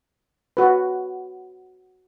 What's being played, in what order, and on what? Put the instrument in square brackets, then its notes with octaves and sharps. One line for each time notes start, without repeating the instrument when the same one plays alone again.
[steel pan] F#4 B4